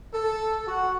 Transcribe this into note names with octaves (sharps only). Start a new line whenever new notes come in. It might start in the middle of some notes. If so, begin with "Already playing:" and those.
A4
F#4